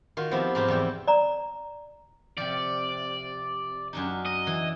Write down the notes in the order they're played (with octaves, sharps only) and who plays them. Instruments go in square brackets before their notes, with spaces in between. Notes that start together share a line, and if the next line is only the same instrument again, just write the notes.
[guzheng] D#3 F4 F#4
F3 B3 C4 E4 G4
G#2 C3 F3 F4 G4
E2 G3 E4 G5
[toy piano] D5 A#5
[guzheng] C3 F3 [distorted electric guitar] D5
[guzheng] F#2 D4 D#4
[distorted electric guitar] D#5
[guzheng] E3